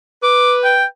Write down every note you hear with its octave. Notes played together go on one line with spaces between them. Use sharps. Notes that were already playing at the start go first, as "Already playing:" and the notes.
B4 D6
G5